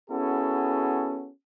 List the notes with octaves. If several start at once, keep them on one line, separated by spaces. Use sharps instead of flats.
B3 C#4 E4 F#4 G#4 A4